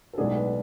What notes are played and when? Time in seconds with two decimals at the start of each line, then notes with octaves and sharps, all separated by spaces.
0.13 A4
0.18 B1 A2 G#3 B3 D4 G#4
0.36 B4